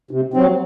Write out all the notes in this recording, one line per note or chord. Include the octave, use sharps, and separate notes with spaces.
C3
F#3 C4